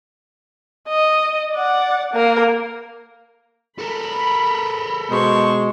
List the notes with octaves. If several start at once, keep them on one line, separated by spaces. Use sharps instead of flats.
D#5
D5 F#5
A#3 A#4
A4 A#4 B5
B2 G#3 C5 C#6